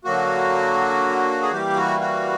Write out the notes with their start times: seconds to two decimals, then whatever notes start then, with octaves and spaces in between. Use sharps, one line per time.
0.05 D3 F#3 A#3 F#4
1.42 G#4
1.51 E3 G3 A#3 G4
1.76 F#4
2.00 F#4